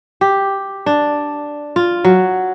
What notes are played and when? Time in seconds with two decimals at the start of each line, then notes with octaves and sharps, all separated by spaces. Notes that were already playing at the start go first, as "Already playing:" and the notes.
0.21 G4
0.86 D4
1.76 F4
2.05 F#3